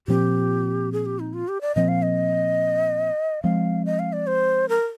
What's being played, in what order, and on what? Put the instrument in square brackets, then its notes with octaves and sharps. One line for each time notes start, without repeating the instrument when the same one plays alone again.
[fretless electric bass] A#2 F3 C4 [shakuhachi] G4
[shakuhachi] G#4
G4
D#4
F4
G4
D5
[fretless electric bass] A#2 F3 C4 [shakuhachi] D#5
[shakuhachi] F5
D#5
[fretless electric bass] F3 G#3 C4 [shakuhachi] F5
[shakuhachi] D#5
F5
D5
C5
A#4